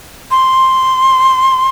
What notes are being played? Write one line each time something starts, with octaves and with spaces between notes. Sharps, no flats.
C6